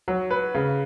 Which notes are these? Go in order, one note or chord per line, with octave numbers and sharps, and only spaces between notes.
F#3
B4
C#3